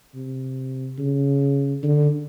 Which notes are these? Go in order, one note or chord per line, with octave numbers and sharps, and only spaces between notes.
C3
C#3
D3